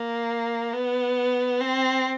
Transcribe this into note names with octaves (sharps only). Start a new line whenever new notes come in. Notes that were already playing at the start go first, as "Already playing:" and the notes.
Already playing: A#3
B3
C4